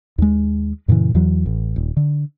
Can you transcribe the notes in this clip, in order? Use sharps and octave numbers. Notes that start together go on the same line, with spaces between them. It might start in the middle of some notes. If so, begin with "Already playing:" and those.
D#2 G#3
F#2 A#2 C#3 E3
E2 E3 F#3
A1
D#1
D3